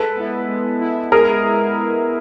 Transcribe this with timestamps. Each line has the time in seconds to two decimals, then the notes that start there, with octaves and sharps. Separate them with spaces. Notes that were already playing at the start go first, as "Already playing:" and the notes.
Already playing: G#3 A4 B4
0.16 B3 E4
0.48 G#3
0.81 B3 E4
1.12 G#3 G#4 A#4
1.44 B3 E4
1.77 G#3